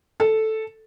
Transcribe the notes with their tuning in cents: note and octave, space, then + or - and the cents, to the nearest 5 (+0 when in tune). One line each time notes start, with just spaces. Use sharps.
A4 -5